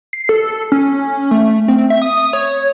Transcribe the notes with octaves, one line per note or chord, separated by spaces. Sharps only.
C7
A4
C#4
A3
C4
E5
D#6
C#5